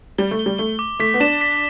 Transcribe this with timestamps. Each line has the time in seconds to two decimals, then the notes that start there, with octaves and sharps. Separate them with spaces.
0.18 G3 G7
0.31 A3
0.39 G7
0.46 G3
0.58 A3 G7
0.79 D6
0.99 A3 B6
1.14 B3
1.20 D4 E7
1.41 B6